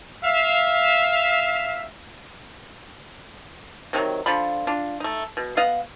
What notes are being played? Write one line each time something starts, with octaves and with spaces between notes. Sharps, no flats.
E5 F5
C3 D#3 F3 F#3
D3 F3 F4 B5
D4 F4
A3 D#4
B2
B3 D#5 F5 F#5